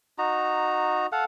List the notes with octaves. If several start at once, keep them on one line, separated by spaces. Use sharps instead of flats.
D#4 F#4 A#5
A4 F5 F#5